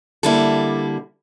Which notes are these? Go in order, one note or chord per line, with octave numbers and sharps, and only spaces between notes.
D3 G3 A#3 E4 A4